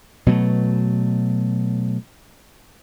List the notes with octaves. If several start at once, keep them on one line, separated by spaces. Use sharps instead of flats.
B2 F#3 A3